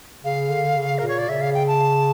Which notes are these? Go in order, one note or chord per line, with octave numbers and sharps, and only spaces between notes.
C#3 F5
D3
C#3
A#2 A#4
C#5
D5
C#3 E5
F5
G5
A5